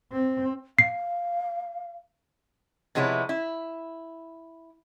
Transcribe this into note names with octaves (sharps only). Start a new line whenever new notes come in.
C4
F5 C7
C3 F3 G#3 B3 E4 C#5
E4